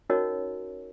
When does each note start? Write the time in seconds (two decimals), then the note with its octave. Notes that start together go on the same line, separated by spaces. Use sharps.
0.09 C#4 D#4 F#4 A#4 C#5 D#5